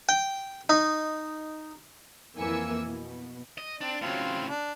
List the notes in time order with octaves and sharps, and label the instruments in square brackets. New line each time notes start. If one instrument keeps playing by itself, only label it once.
[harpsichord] G5
D#4
[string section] F2 E3 A#3 G#5 E6 C#7
B2
[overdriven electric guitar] D#5
[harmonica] C4 [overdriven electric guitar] D4
[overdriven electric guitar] A2 C#3 [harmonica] F#3 C4 F4
[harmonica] D4